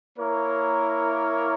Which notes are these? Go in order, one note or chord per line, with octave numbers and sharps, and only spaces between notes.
A#3 E4 A#4 C#5